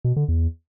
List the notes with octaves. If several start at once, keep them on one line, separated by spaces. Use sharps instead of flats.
B2
D3
E2